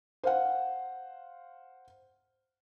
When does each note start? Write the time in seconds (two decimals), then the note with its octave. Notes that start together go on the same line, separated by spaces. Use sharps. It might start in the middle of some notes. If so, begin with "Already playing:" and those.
0.24 C5 F5 F#5